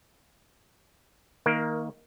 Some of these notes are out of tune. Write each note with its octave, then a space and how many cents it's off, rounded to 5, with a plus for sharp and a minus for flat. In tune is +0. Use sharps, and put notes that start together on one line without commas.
D#3 +25 A#3 +0 A#4 +15